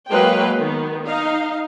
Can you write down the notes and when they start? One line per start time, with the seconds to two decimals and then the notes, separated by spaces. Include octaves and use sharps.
0.10 F#3 G#3 A#3 B4 F5 G5
0.56 D#3 B3
1.06 D#4 F5